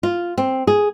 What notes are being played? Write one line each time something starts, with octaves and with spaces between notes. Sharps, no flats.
F4
C4
G#4